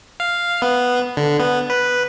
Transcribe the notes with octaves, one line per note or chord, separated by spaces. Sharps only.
F5
B3
D3
B3
B4